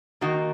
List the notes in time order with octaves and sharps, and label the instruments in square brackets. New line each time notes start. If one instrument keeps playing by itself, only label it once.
[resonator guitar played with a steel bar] D#3 A#3 D#4 F#4